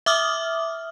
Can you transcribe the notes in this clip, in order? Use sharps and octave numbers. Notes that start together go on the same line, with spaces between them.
E5 D6 D#6 F6